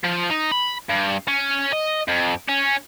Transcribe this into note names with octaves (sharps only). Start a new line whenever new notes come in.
F3
D#4
B5
G2
C#4
D#5
F2
C#4